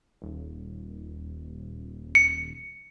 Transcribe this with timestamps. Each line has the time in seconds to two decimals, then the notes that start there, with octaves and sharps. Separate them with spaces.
0.22 D#1
2.15 C#7